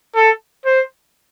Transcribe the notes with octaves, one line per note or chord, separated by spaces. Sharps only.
A4
C5